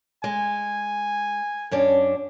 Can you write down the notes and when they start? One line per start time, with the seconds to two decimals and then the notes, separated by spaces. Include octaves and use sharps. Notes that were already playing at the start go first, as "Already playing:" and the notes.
0.24 G#3 G#5
1.71 F#2 C#4 D4